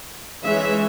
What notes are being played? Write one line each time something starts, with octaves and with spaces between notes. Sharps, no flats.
E3 G#3 C#4 E5